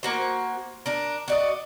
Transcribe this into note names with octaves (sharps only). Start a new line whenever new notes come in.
A#3 F#4 C5
D4 A#4
F#4 D5 D#5